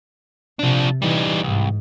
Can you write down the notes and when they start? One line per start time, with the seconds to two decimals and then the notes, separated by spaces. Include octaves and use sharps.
0.59 C3 F3 D4
1.02 E3 G3 D#4
1.43 C2 G#2